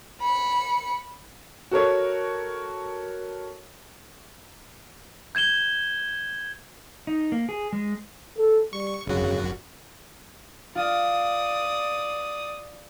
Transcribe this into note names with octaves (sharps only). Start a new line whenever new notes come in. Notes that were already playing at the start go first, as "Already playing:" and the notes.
B5 C#7
F#4 A4 A#4 C#5
G6 G#6 E7 G7
D#4
A#3
G#4
G#3
A4
G3 C#6
G#1 F#2 C#3 F#4
F4 D5 D#6